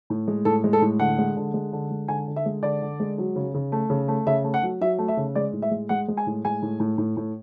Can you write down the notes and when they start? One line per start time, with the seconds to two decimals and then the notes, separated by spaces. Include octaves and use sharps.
0.10 A2
0.28 G#3
0.45 A2 A4
0.64 G#3
0.73 A4
0.82 A2
0.99 D3 F#5
1.19 G#3
1.37 D3
1.54 G#3
1.73 D3
1.91 G#3
2.08 D3 G#5
2.28 D3
2.36 E5
2.46 G#3
2.63 D3 D5
2.82 D3
3.00 G#3
3.18 F#3
3.36 C#3
3.54 C#3
3.72 A3
3.90 C#3
4.08 A3
4.26 C#3 E5
4.44 A3
4.54 F#5
4.63 F#3
4.81 F#3 E5
4.98 A3
5.08 E5
5.17 C#3
5.35 G#3 D5
5.53 A2
5.62 E5
5.71 G#3
5.89 G#3 F#5
6.08 G#3
6.17 G#5
6.27 A2
6.45 G#3 G#5
6.62 A2
6.80 A2
6.98 A2
7.17 A2